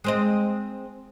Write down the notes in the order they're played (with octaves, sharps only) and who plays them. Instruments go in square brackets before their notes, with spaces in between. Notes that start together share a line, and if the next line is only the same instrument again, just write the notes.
[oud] G#3 C4 D#5